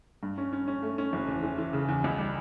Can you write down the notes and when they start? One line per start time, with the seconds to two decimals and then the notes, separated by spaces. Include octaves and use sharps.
0.23 G2
0.38 C#4
0.53 C#4
0.68 C#4
0.82 A3
0.98 C#4
1.13 F#1
1.28 E2
1.43 E3
1.58 E3
1.73 C#3
1.88 E2
2.04 C#2
2.18 G3